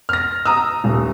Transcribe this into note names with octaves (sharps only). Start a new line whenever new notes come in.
F6 A#6
A#5 D#6 E6
D#1